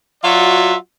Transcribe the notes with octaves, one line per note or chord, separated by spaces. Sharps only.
F#3 F4 F#4 D5 E5